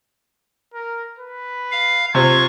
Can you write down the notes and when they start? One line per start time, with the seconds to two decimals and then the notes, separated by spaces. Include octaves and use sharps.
0.74 A#4
1.19 B4
1.72 F5
2.15 C3 F4 C5 C#6 G#6